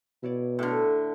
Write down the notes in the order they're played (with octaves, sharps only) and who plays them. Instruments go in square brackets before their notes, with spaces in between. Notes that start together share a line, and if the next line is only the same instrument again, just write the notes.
[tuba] B2 [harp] E4 C#5 D5
[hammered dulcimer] A2 D3 [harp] A4 F#5 F6